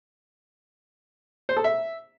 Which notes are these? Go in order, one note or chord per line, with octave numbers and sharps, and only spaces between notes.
C5
A4
E5